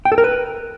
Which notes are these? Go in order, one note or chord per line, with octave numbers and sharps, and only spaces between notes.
G5
A4
A#4
B4